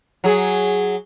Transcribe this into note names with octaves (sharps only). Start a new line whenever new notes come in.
F#3 G#4